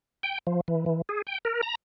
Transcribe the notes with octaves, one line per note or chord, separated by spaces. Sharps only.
G5
F3
E3
E3
G#4
G5
A#4
A#5